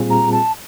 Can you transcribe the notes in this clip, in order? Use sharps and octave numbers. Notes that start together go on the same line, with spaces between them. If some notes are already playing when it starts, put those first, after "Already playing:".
Already playing: A#2 G3 C4 F4 G#4
A#5
A5